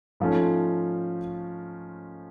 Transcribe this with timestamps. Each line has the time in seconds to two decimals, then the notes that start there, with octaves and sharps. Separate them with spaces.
0.20 G#2 F3 A3 C#4 F4